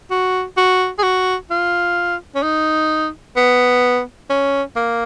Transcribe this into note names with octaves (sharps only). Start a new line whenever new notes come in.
F#4
F#4
G#4
F#4
F4
C#4
D#4
B3
C#4
A#3